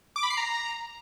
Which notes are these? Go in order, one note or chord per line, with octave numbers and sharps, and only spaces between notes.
D6
B5
C7
A#5